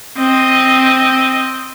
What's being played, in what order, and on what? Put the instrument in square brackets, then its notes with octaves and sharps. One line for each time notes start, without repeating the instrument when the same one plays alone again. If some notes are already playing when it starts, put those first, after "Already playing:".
[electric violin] C4 D#5